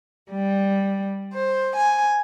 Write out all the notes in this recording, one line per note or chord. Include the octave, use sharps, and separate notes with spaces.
G3
C5
G#5